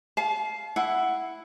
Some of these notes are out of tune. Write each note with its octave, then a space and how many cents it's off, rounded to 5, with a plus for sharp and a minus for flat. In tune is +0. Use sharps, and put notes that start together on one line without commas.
F5 +0 A5 -40
E4 +0 F#5 +5